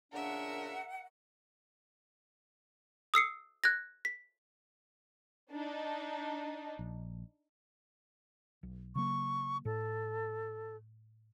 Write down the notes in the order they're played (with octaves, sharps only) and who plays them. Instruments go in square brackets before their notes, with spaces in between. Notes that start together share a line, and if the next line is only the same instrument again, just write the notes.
[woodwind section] A#2 C#3 D4 [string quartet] A#4 E5 [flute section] F#5
[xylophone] D#6 E6 C7 C#7
F#6 G#6 A#6
B6
[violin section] D4 D#4
[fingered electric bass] A#1
[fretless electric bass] B1
[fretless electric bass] C#3 F#3 A#3 [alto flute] C#6
[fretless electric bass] A2 [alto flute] A4